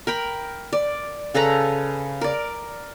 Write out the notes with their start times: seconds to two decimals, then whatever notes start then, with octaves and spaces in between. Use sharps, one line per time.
0.07 A#4 G5 B5
0.73 D5
1.34 C#3 A4 B4 A#5
2.21 A#4 D5